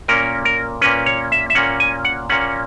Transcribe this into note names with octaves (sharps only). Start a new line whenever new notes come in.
A#2 A#3 C#4 A#4
A#4
A#2 A#3 C#4 B4
C#5
E5
E5
A#2 A#3 C#4 F#5
G#5
F#5
A#2 A#3 C#4 F#5